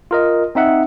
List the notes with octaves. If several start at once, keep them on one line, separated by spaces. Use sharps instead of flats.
F4 A#4 D#5
C4 D#4 E5 F#5